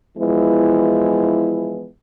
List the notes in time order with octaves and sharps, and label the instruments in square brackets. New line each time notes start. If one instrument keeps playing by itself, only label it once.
[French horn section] E3 F3 G#3 B3 E4